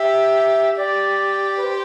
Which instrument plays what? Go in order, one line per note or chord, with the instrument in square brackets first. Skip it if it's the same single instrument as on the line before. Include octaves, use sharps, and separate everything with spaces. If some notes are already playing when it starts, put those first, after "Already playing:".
Already playing: [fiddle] G4 [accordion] E5
[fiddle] G4 [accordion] D5
[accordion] B4
C5